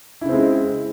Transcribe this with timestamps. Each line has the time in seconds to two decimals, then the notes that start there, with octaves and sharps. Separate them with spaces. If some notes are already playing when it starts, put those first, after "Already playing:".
0.21 E4
0.25 C#3
0.29 C4
0.33 G#3